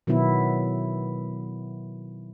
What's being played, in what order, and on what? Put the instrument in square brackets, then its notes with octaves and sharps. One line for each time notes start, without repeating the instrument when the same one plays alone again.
[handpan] B2 D#3 F#3 B3 E4